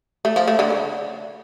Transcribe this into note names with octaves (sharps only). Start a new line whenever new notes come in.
A3
F3
A3
D3
C#3